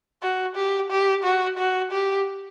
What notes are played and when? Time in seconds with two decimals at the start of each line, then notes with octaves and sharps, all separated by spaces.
0.22 F#4
0.56 G4
0.90 G4
1.23 F#4
1.58 F#4
1.92 G4